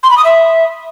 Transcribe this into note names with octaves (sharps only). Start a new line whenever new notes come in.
C6
B5
D#6
E5